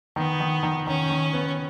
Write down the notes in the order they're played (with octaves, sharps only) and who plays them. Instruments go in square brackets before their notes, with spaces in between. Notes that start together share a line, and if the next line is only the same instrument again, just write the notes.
[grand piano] D#3 [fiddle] B3
[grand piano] D#3
D#3
[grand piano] D#3 [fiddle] C#4
[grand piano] D#3
B3